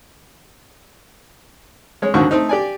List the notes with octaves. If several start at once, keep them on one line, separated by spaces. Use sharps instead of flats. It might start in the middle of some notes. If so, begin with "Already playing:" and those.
G#3 C#5
D#2 G#2 D3 D#3 F#4 C#6
A3 C4 D#4
G4 D5 G#5